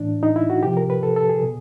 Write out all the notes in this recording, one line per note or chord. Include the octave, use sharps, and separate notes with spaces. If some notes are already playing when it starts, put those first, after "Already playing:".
Already playing: A2 E3 D4
D#4
E4
F#4
C3 F3 G4
A#4
B4
A4
A4
G#4
B2